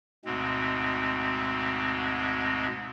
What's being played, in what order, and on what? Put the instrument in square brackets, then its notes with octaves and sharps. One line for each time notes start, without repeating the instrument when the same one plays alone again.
[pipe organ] D2 G#2 B2 G#3 C4